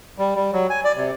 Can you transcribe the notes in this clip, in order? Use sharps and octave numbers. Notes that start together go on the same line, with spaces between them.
G3
G3
F#3
G#5
D5
C3